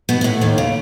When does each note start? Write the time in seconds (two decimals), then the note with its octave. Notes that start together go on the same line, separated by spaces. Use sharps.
0.09 B2 B3
0.21 B3
0.24 A2 A3
0.41 D#2 D#3
0.58 C#3